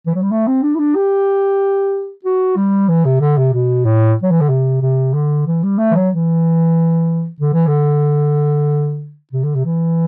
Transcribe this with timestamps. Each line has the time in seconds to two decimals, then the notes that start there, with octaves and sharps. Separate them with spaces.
0.07 E3
0.15 F#3
0.22 G3
0.31 A3
0.47 C4
0.63 D4
0.75 E4
0.79 D4
0.95 G4
2.25 F#4
2.56 G3
2.89 E3
3.05 C3
3.21 D3
3.38 C3
3.53 B2
3.85 A2
4.23 F#3
4.31 E3
4.41 D3
4.49 C3
4.82 C3
5.14 D3
5.47 E3
5.63 G3
5.78 A3
5.91 E3
5.95 F#3
6.11 E3
7.40 D3
7.53 E3
7.67 D3
9.33 C3
9.44 D3
9.55 C3
9.65 E3